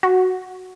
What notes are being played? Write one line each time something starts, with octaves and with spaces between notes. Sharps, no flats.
F#4